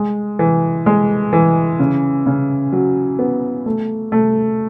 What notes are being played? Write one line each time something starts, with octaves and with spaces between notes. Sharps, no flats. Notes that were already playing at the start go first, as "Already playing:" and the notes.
Already playing: G#3
E3
G#3
E3
C#3
C#3
F#3
B3
A3
A3